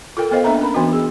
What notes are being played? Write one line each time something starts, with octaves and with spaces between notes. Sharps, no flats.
F4 A4 A#4 G5
B3 A4 C5 D#5 F5
A#3 D4 B4 E5 A#5
C#4 A#4 B5
E3 B3 D4 F#4 D#5
G#4